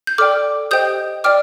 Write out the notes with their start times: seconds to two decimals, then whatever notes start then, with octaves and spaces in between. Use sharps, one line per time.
0.07 G6
0.18 A4 D5 G5 D6 F6
0.71 G4 C5 D#5 G5 D#6 G6
1.24 D5 G5 D6 F6